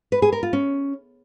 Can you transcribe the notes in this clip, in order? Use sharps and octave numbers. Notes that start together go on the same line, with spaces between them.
B4
G#4
A#4
F4
C#4